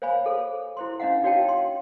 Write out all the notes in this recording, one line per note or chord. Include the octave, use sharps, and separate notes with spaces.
C5 C#5 F5 G#5 B5
G#4 A4 C5
E4 C5 C6
C#4 D4 D#5 F5 F#5
D#4 F#4 C#5 F5 G5 A5
C6